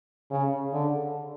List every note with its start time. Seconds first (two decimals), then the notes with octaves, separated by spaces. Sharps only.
0.31 C#3
0.73 D3